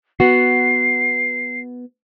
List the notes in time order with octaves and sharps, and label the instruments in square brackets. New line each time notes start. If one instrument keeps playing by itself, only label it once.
[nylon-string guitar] B3 F#4 [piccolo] C7